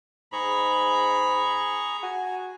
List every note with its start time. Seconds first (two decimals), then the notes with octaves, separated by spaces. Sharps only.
0.33 G#2 G#4 A#5 B5 C#6
2.03 F#4 G#5